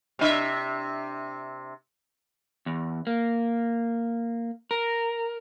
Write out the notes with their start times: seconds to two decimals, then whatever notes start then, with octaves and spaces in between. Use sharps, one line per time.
0.19 C3 D4 E5
2.66 E2
3.07 A#3
4.71 A#4